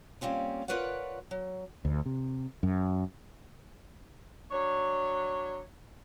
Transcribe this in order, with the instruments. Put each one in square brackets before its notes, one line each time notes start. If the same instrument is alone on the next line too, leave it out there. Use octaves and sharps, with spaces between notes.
[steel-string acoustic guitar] G3 A#3 C4 C#4 F4
F4 A#4 B4 C#5 D5 F#5
F#3
[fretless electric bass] D2
C3
F#2
[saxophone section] F#3 D4 C#5